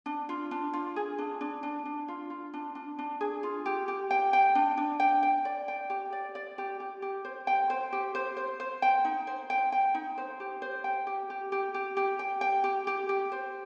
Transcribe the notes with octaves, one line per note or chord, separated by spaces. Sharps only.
D4
F4
D4
F4
G#4
D4
D4
D4
D4
F4
F4
D4
D4
D4
G#4
F4
G4
G4
G5
G5
D4
D4
G5
G5
D5
G5
G4
D5
D5
G4
G4
G4
C5
G5
C5
G4
C5
C5
C5
G5
D#4
C5
G5
G5
D#4
C5
G4
C5
G5
G4
G4
G4
G4
G4
G5
G5
G4
G4
G4
C5